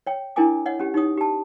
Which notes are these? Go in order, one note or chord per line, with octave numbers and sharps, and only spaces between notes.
C#5 G5
D4 E4 A#4 G5 G#5 D6
C#5 D#5 F#5
C#4 G4
D#4 G4 C#5 D#6
G4 A5